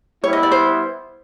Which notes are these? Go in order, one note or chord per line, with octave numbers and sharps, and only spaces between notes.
G3 B3 E4 C#5
D#5
D5
C5